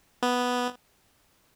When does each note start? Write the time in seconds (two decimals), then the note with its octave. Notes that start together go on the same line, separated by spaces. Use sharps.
0.23 B3